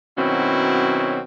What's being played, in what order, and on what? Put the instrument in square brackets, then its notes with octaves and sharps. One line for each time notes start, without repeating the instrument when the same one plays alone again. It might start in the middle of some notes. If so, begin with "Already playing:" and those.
[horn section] B2 D#3 F#3 C4 C#4 E4